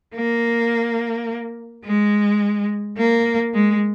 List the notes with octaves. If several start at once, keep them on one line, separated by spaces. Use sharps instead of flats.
A#3
G#3
A#3
G#3